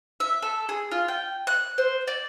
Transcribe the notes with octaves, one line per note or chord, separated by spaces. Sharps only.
E5
A4
G#4
F4
G5
F#6
C5
D5